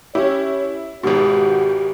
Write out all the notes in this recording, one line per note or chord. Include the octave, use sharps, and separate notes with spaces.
C#4 E4 G4 C#5
G#1 G#2 B2 F#4 G4